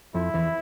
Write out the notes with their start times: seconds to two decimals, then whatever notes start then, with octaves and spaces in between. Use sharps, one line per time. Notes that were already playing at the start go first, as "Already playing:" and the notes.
0.14 F2 F3 E4
0.34 E2 E3